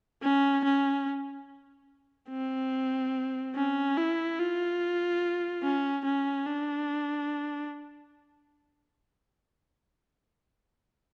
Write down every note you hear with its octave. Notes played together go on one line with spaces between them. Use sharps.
C#4
C#4
C4
C#4
E4
F4
C#4
C#4
D4